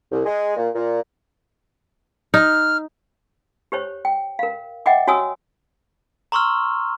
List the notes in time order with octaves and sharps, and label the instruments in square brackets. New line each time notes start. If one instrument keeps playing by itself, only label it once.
[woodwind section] C2
G#3
A#2
A#2
[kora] D#4 [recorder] F6
[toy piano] G4 C5 C#5
G5
A#4 F5
D#5 E5 F#5 G5 D6
F#4 C#5 G#5 D#6 E6
[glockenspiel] A#5 C6 C#6 E6 F6